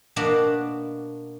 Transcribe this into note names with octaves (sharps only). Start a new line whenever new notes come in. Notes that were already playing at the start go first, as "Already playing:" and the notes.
B2 A#3 D4 F#4